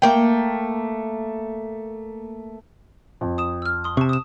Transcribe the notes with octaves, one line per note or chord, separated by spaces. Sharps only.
A3 A#3 G5
F2
D#6 E7
E6 F6
C6 D#6
C3 A5 C#6
D#6 E7